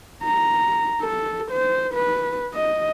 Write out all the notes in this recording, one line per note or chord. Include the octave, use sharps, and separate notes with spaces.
A#5
A4
C5
B4
D#5